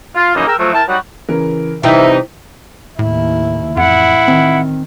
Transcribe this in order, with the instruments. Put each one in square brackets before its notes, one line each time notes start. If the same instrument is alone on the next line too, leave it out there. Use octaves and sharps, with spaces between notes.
[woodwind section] F4
F#2 C#3 E3 F3 A#3 D#4
G#4 A#4 G5 A#5 E6
F3 F#3 A3
E4 A#4 G5 A5
F#3 G3 D#4 F#4
[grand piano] C#3 E3 A#4
[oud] C3 E3 G3 [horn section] D#4 [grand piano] E4 G5 [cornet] E5
[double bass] D#2 E4 [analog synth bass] A2
[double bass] A1 [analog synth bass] F2 [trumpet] E4 [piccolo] F#5
[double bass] D#3 [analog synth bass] C4